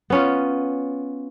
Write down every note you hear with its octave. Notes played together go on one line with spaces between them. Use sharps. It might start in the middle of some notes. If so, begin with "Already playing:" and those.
B3 C#4 F4